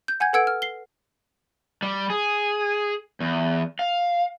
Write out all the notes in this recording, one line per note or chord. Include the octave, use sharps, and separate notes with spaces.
G6
F#5 G#5 G6 G#6
A4 B4 F#5 E6 G#6 D7
F6
C7 G7
G3
G#4
E2
F5